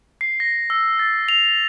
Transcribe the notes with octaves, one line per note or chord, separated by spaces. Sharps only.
C7
A#6
E6
A6
F7